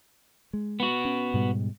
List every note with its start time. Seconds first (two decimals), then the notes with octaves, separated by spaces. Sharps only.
0.53 G#3
0.80 B3 F#4
1.05 C#4
1.34 G#2 B2 G3